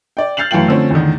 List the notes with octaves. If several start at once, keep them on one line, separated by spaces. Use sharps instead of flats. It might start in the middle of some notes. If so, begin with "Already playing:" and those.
D5 G5
F6 G6 A6 C7 F7 F#7
F#2 E3 A3 F5 G5 F#7
D3 F3 A3 C4 C#4
E2 A2 D3 D#3